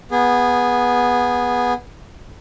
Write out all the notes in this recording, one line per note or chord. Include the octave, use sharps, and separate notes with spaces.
B3 G#4